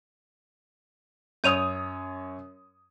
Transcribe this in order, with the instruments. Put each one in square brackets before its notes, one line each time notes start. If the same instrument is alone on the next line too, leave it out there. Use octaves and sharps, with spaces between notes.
[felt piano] F#2 C#5 D#6 [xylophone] G6 D#7 F7